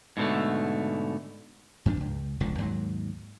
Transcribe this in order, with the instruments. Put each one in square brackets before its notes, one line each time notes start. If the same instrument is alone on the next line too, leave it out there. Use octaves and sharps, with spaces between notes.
[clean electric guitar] G#2 B2 D3 A3
[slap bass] G2 F3 C#4 D4
C#2
E1 C#2 D3 F3
D#2 G#2 F#3